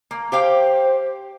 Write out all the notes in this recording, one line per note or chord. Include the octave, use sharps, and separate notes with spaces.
A#3
G4 C5 F5 G5